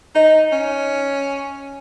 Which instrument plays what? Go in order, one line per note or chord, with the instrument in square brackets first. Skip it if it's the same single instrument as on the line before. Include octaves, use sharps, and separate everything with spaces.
[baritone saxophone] D#4 [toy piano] D#5
[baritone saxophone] C#4